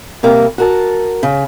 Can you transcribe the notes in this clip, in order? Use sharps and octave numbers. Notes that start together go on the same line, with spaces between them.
C3 G3 A#3
F#4 A#4 A5
C#3